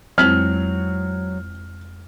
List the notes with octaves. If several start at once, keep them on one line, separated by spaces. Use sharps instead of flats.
F2 F#3 G#3 C4 E4 F6